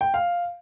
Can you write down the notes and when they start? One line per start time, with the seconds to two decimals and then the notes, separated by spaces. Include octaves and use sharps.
0.01 G5
0.14 F5